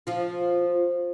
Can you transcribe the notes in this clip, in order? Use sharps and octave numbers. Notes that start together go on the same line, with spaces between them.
F3 F4